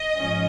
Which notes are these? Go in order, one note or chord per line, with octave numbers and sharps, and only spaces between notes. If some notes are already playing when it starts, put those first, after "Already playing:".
Already playing: D#5
G#2 F3 C#4